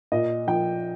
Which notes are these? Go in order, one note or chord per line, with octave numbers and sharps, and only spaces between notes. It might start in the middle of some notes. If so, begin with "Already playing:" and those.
A#2 D#5
F3 G5